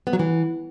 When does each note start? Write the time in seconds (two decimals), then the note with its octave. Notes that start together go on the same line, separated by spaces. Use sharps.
0.07 B3
0.13 F#3
0.19 E3